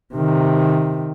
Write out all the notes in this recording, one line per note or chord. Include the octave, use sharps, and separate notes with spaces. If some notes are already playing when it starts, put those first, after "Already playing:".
C3 D#3